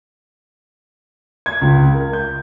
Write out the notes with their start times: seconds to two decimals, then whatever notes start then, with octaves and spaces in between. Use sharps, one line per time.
1.46 G#6
1.62 C#2
1.94 A#4
2.13 G6